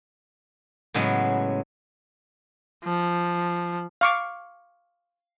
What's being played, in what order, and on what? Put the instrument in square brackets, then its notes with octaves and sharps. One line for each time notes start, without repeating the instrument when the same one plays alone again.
[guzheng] A2 C#3 F#3 G#3 B3
[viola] F3
[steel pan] F5 C#6 D6